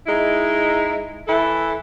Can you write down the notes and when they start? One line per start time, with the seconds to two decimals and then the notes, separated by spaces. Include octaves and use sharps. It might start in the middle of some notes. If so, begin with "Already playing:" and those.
0.07 G#3 D#4 E4
1.28 E3 E4 A4